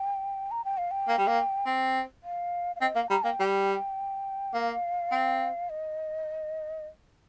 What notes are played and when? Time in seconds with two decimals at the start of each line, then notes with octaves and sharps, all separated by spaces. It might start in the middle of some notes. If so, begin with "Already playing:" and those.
Already playing: G5
0.51 A#5
0.65 G5
0.78 F5
0.91 G5
1.08 A#3
1.18 G3
1.27 A#3
1.66 C4
2.23 F5
2.76 F5
2.81 C4 D#5
2.96 A#3 F5
3.10 G3 A#5
3.24 A#3 G5
3.40 G3
4.54 A#3 F5
5.11 C4
5.70 D#5